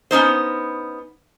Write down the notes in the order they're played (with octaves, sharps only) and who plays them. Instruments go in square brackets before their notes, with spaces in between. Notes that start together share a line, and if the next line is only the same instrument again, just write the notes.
[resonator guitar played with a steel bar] B3 C#4 D#4 C5